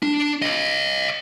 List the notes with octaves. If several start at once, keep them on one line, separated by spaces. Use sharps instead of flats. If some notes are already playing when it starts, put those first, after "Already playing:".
D4
C#5 D#5